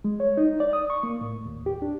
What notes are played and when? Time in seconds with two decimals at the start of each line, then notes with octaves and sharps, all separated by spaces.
0.04 G#3
0.20 C#5
0.37 D#4
0.60 D5
0.73 D#6
0.90 C#6
1.03 A#3
1.21 A2
1.46 D#2
1.66 G4
1.82 D4